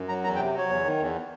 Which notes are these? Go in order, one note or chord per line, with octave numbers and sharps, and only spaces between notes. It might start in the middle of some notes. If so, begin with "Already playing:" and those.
Already playing: F#2
F#3 A#5
E2 A#5
G5
C3
F#3 C#5
E2
D#3
E2